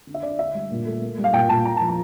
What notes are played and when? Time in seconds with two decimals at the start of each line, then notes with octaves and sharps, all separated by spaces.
0.07 D3
0.14 E5
0.23 D3 D5
0.38 D3 E5
0.54 G3
0.71 A#2
0.86 A3
1.01 A#3
1.18 G3
1.24 F5
1.33 A#2 G5
1.49 A#2 A5
1.65 A#3 A#5
1.77 F3 A5
1.88 A#5